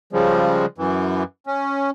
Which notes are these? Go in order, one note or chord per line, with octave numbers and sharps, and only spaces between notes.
C#3 F3 G3 G#3
F#2 E3
C#4